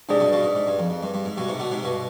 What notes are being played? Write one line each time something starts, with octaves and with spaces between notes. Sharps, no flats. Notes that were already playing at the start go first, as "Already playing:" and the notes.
G#2 C3 D4 G#4 D5
G2 B2
G2 B2
G#2
G#2
G2
F2
F2
G2
G2
G#2
G2 B2
G#2 C3
B2 D3
G#2 C3
G2 B2